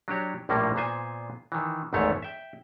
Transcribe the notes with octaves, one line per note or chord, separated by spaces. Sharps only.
F#3 D4 F#4 G4 C#5
A#1 A2 F3 G3 A#3
A#2 B3 C5 G#5
D#3 E3
G#1 E2 G#2 A3 B3 C#5
E5 G5